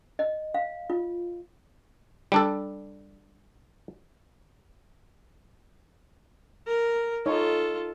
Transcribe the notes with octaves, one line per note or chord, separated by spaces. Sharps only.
D#5
F5
F4
G3 D4 A4
A#4
D#4 F4 A4 C#5